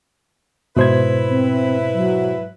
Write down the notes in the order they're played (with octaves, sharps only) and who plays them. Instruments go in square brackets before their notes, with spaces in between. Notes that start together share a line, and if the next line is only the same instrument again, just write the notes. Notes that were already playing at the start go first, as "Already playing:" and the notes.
[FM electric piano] G#2 [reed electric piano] B2 C5 G#6 [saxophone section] E4 B4
[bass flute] C4
F#3